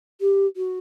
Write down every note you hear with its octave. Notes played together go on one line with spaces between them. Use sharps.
G4
F#4